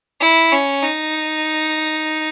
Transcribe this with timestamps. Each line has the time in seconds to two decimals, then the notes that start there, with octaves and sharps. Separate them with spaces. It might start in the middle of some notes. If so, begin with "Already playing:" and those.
0.21 E4
0.52 C#4
0.83 D#4